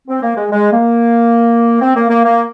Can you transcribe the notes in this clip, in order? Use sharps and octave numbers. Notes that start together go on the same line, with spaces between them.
C4
A#3
G#3
G#3
A#3
C4
A#3
A#3
A#3